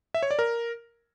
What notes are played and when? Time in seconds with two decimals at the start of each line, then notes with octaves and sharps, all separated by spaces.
0.14 E5
0.23 C#5
0.31 D5
0.39 A#4